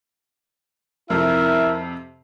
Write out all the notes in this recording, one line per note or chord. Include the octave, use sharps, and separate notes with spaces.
F2 C3 E4 A#4 E5